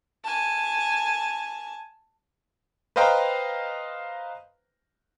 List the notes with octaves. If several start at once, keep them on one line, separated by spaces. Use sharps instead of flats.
G#5 A5
B4 C5 D#5 F5 G5 A#5